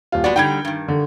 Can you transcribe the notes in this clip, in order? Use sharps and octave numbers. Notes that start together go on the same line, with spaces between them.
D#1 F4
G#3 B3 F#4 D5
D3 G3 D#4 G5 G#6
G2 D#3
D3